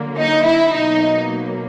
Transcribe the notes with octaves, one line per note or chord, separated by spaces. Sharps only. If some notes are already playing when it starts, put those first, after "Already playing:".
Already playing: D3 F#3 A#3
D#4
E4
B2 F#3 A#3 D#4